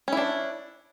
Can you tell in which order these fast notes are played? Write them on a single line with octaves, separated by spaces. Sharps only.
C#4 E4 D4